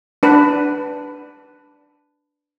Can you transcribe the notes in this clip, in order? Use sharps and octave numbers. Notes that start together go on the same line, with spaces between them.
D4 B4